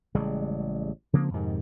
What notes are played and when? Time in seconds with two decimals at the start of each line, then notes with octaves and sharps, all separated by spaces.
0.15 A1 C#3 G3 G#3
1.13 C#3 F3 A#3 C4
1.33 F2 G#2 C3 D#3